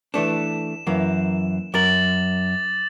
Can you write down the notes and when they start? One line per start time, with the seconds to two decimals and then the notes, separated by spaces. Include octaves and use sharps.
0.14 E3 A3 D4 E7
0.87 F#2 E3 A#3
1.74 F#2 A#4 D6 A6 F#7